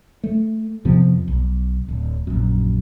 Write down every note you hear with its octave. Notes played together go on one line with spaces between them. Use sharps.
A3
F2 C3 F3 B3
B1
D1
A#1 F#2